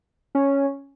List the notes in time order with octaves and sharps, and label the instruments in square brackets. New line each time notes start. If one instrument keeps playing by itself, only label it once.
[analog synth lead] C#4